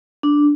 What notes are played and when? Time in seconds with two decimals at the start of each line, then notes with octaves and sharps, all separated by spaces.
0.23 D4